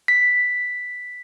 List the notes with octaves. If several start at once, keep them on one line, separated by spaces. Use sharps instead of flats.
B6